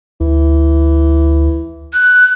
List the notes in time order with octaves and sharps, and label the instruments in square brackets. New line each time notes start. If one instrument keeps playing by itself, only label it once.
[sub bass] D2 [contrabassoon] E3
[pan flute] F#6